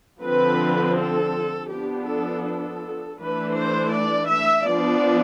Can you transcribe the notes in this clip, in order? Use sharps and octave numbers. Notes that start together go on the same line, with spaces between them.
D3 F3 C4 B4
A4
F3 B3 D4 G4
A4
A4
E3 A3 D4 B4
C5
D5
E5
F3 B3 D4 D5